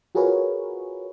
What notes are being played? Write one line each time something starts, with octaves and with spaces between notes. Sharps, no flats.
F4 F#4 G#4 A#4 B4 C#5